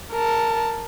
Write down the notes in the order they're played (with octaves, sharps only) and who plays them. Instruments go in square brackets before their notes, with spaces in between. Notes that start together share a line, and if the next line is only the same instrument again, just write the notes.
[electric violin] A#4 A5